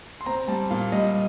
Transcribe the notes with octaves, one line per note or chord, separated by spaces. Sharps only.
C6
C4 A#5
G3 A5
A#2 F5
G3 D#5